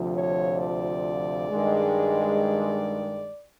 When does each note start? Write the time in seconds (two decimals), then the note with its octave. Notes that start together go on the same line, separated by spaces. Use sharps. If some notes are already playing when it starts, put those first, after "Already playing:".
Already playing: D2 C3 F3
0.12 C#5
0.57 D5
1.49 G2 D#3 G#3